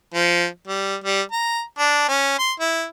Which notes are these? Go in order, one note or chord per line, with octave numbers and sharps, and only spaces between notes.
F3
G3
G3
A#5
D4
C#4
C6
E4